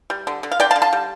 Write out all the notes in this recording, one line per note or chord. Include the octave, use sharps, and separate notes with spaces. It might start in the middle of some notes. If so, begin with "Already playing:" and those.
G3
D3
D3
F5
D3 D5 G5
F5 A5
D3
F5 A5
G3